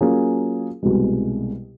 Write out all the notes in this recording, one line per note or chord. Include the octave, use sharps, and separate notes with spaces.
F#3 A#3 C#4 F4 G#4
C2 B2 G#3